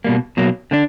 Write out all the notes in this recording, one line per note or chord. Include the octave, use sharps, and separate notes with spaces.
B2 G3 A#3
B2 F#3 A#3
D3 A#3 D4